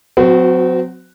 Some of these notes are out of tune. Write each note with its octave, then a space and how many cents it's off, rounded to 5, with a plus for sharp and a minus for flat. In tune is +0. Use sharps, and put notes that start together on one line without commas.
F#3 -30 C4 -35 F#4 +0